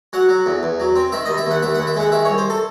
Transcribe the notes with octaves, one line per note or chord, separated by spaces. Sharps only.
F#3 F#5
F#3
E2
E2
F#3
C4
D#3 E5
D#2 D#5
E5
D#2 F#5
D#2 E5
F#5
D#2
E5
G#3 F#5
D#3 E5
C#5
C2
C5
A4